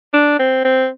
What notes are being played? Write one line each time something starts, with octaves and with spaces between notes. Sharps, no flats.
D4
C4
C4